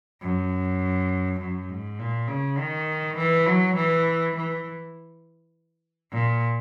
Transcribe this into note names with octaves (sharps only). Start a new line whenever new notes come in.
F#2
F#2
G#2
A#2
C#3
D#3
E3
F#3
E3
E3
A#2